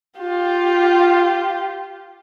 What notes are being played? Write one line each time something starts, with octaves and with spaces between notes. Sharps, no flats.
F4 G4